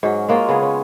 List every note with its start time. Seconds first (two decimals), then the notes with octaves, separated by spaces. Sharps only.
0.03 G#2 F#3 C#4
0.28 G#3 A#3 C#4 F4
0.49 C#3 B3 G#4
0.62 C#4